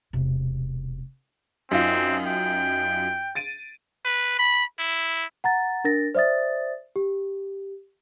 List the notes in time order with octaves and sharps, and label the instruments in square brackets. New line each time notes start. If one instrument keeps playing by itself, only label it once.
[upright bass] E1 C3
[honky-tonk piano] F#2 D#4 F4 [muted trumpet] C4
[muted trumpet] G5
[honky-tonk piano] A6 D7 D#7
[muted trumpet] B4
B5
E4
[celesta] F#5 A#5 A6
D4 A#4 A6 A#6
C5 D5 E5 D#6 A6
G4